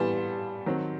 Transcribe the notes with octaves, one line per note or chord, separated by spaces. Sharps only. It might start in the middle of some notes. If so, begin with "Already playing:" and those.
Already playing: E3 G3 B3 A5 C6
D#3 F#3 C4